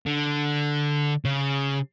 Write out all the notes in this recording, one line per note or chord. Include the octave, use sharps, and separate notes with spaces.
D3
C#3